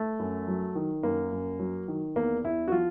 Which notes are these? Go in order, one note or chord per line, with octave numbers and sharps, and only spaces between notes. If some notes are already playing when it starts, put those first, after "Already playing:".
Already playing: A3
F#2
F#3
D#3
F#2 A#3
F#2
F#3
D#3
E2 A#3
E2 E4
F#4
F3 F4